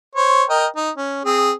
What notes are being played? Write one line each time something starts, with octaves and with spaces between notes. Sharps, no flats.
C5 C#5
A#4 D#5 G5
D#4
C#4
C4 G#4